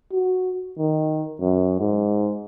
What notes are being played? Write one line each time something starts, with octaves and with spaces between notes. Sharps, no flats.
F#4
D#3
F#2
G#2